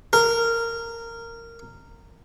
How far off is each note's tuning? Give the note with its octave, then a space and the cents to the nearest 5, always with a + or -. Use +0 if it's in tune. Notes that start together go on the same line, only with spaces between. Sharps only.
A#4 -15